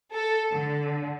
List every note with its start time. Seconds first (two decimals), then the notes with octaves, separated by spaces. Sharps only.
0.13 A4
0.52 D3